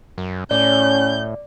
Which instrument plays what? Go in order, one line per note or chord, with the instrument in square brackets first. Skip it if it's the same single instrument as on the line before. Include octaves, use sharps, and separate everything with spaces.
[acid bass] F#2
[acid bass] A2 [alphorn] C#4 [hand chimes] D5 [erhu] G6